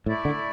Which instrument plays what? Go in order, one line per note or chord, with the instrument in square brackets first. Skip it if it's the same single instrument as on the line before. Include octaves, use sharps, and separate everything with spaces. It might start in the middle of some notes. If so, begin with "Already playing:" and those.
[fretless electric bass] A2 [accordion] A3 E4 D5
[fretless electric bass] D3